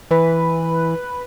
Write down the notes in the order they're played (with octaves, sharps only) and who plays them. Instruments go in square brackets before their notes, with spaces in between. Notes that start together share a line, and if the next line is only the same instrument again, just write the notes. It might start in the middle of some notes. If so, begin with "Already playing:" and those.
[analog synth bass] E3 [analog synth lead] B4